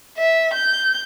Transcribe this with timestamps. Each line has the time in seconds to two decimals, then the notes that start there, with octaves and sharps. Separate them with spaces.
0.18 E5
0.54 G6